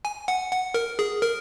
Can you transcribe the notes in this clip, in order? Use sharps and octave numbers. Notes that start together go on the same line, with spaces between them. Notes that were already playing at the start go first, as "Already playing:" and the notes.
G#5
F#5
F#5
A#4
G#4
A#4